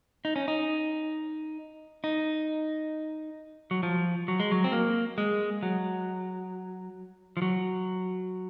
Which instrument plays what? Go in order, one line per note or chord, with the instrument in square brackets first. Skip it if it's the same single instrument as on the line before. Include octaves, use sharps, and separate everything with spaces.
[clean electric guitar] D#4
C#4
D#4
D#4
F#3
F3
F#3
G#3
F#3
C4
A#3
G#3
F#3
F3
F#3